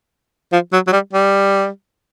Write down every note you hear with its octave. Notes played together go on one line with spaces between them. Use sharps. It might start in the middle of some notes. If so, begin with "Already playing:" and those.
F3
F#3
F#3
G3
G3